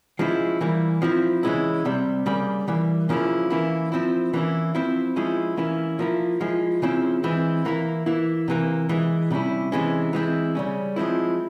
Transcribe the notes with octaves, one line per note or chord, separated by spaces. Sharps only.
F3 G#3 C#4 E4
E3 G3 A#3 E4
F3 C4 E4
C#3 E3 G#3 C#4 E4
C3 G3 C4
C#3 G3 A#3
E3 G3 A#3
C#3 F3 A#3 C#4 E4
E3 A#3 C#4 E4
F3 C4 E4
E3 A#3 C#4 E4
F3 C4 E4
F3 G#3 C#4 E4
E3 A#3 C#4 E4
F3 A#3 E4
F3 G#3 E4
C#3 F3 C4 E4
E3 G#3 C4 E4
E3 A#3 E4
E3 A#3 E4
C3 E3 A#3
E3 G#3 E4
C3 G3 C#4 E4
C3 E3 G#3 C#4 E4
E3 G#3 C4 E4
C#3 G3 C#4
F3 G#3 C4 E4